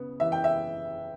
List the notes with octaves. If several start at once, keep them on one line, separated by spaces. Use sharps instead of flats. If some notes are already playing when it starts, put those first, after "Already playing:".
Already playing: C#3 B3
E3 E5
G5
E5